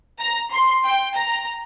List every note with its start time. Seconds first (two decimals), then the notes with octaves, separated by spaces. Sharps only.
0.20 A#5
0.51 C6
0.84 G5
1.16 A#5